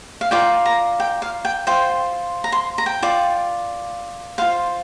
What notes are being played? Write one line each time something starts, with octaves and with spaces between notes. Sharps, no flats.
F5
F4 A#4 D5 G5
A#5
G5
F5
G5
F4 C5 G5
A#5
C6
A#5
G5
F4 D5
F4 C5 F5